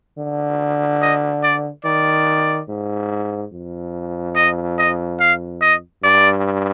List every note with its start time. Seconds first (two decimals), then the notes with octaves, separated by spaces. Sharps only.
0.18 D3
1.02 D#5
1.43 D5
1.85 D#3 D5
2.69 G#2
3.52 F2
4.36 D#5
4.78 D#5
5.20 F5
5.61 D#5
6.04 G2 D5